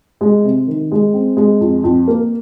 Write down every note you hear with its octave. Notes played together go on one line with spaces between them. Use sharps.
G#3
C3
D#3
G#3
C4
G#3
F2
F2
A#3